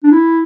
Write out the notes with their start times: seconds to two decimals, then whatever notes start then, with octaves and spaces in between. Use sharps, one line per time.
0.04 D4
0.12 E4